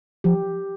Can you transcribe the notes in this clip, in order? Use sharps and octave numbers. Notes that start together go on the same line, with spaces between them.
F3 G4